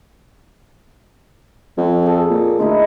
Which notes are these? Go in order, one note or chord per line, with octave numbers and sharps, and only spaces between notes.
F2
G#4 A4
A#2
D2 G#3 D#4 E4